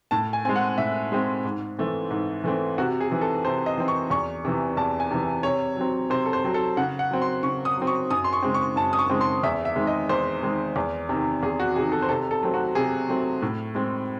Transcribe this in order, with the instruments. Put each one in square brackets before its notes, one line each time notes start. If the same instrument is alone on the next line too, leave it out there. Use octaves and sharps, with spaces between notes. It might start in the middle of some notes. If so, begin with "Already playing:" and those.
[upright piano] A2 A5
G#5
G#3 C4 G#5
F#5
A2 E5
G#3 C4
G#2
E3 A3 C4
G#2
E3 A3 C4
C3 F#4
G#4
E3 C4
A4
C3 C5
D#5
E3 C4
C#6
E2 C#6
C3 E3
E2 A5
G#5
C3 E3
C3 C#5
F#3 C4
C3 C5
A4
C5
F#3 C4
A4
C#3 F#5
F#5
F#3 C4
C6
C#3 C#6
D#6
F#3 C4
C#6
F#2 D#6
C6
C#6
C#3 G#3 C4
C#6
F#2 A5
D#6
C#6
C#3 G#3 C4
C6
E2 E5
E5
D#3 G#3 C4
D#5
E2 C5
D#3 G#3 C4
E2
C3 D#3
E2 G#4
F#4
C3 G#4
D#3
A4
C5
C3 A4
A4
F#3 A3 C4
F#4
C3 G#4
F#3 A3 C4
A2
G#3 C4